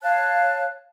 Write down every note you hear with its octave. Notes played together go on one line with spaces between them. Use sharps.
C#5 F5 A5 F#6